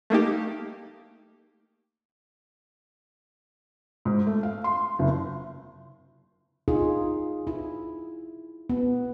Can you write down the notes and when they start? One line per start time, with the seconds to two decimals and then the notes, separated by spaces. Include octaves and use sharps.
0.10 A3 A#3 D#4 G4
4.05 G#2
4.27 A3
4.43 F5
4.64 C6
4.99 F#1
6.68 D#4 F4 G#4
7.47 E4
8.70 B3